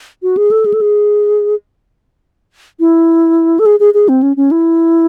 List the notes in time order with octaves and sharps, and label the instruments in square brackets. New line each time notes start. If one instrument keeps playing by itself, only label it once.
[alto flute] F#4
G#4
A4
G#4
A4
G#4
E4
A4
G#4
G#4
G#4
C4
C#4
C#4
E4